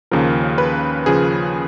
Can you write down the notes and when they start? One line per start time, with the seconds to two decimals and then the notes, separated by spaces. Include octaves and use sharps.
0.11 D#2 C#3 F3 A#4
0.58 B4
1.06 C#3 F3 G#4